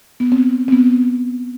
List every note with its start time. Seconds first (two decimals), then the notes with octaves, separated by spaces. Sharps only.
0.20 B3
0.32 C4
0.68 C4
0.72 B3